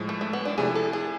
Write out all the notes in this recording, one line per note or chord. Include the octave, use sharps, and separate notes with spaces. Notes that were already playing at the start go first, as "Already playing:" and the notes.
Already playing: A2 F3 G#3
A3
A3
B3
D4
C3 F3 A3 E4 G#4
A4
G#4